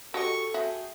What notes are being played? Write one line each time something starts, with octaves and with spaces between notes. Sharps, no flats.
F#4 G4 A4 D#5 C#6
F#4 G#4 E5 G5